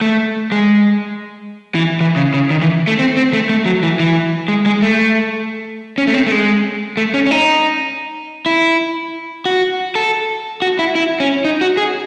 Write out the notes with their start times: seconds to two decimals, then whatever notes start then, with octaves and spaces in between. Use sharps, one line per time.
0.01 A3
0.52 G#3
1.75 E3
2.01 E3
2.16 C#3
2.34 C#3
2.51 D#3
2.62 E3
2.87 A3
2.99 C4
3.17 C4
3.33 A3
3.49 A3
3.66 F#3
3.83 E3
4.00 E3
4.48 G#3
4.66 G#3
4.83 A3
5.98 C#4
6.07 A3
6.14 C4
6.27 A3
6.31 G#3
6.97 A3
7.14 C#4
7.27 C#4
7.31 D#4
8.46 E4
9.46 F#4
9.95 A4
10.62 F#4
10.79 E4
10.95 E4
11.20 C#4
11.45 D#4
11.61 F#4
11.77 G#4